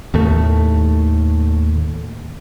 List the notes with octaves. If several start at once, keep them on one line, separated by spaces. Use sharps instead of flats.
D#2 A2 A3